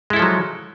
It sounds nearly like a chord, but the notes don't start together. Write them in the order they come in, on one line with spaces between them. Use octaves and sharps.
G#3 E4 A4 F3 F#3